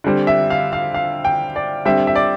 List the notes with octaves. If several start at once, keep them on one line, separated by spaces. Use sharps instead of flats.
D3 G3 C4
E5
F5
F5
F5
G5
D5
D3 G3 C4 E5
E5
D5